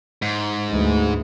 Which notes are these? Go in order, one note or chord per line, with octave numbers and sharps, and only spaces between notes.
G#2
D2 E3 G#3